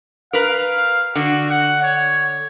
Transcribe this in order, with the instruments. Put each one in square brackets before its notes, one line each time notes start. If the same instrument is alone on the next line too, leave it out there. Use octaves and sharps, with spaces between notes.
[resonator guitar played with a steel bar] A#4 B4 [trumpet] F5
[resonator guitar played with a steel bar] D3 [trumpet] F#4
[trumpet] F#5
C#5